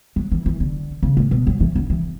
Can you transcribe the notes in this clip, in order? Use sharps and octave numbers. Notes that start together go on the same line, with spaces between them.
F#3
E3
E3
D3
C#3
A2
B2
F#3
E3
D3
E3